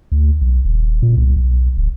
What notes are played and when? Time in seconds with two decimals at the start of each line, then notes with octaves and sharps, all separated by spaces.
0.12 D2
0.41 B1
0.65 D#1
1.02 A#2
1.17 C2
1.36 B1
1.77 D1